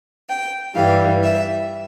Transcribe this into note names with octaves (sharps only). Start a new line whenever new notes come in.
G5
G2 E3 G3 F5
E5